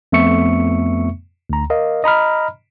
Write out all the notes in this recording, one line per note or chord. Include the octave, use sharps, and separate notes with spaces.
F2 A3 B3 E5 C#6 C#7
D2 A#5
A#4 D#5 F5
D#5 A#5 B5 F6